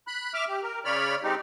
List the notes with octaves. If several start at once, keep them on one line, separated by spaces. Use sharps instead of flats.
B5 F#6
E5 D6 F6
G4
A#4
C#3 C#5 D5 B5 F6
G#3 C4 D#4 G4